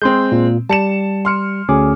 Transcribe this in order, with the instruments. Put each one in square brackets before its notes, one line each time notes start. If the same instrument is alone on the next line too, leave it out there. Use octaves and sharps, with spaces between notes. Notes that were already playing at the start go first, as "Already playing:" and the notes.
[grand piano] G#3 C4 [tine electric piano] C6 G6
[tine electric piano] A#2
[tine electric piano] G3 [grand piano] A5 C#7 E7
[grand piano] C6 F6 C#7
[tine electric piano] D2 C#4 D6 [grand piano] G#4